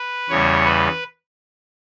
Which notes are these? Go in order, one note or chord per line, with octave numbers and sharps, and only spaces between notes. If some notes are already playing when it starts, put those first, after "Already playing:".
Already playing: B4
E2 C#3 G3 C#5
B4